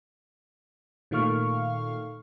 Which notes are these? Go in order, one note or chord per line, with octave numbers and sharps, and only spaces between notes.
A#2 D#3 A3 F5 C#6 F6